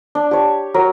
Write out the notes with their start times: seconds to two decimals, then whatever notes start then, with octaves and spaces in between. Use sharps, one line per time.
0.15 D4
0.31 G4 C#5
0.74 F#3 A#4